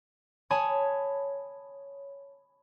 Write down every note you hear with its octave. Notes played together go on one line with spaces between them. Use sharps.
C#5 G#5 A5 B5 D#6 G#6